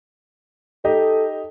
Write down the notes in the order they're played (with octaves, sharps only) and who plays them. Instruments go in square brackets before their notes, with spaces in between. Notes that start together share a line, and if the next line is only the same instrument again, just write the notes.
[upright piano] D#4 G4 D#5 [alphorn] A4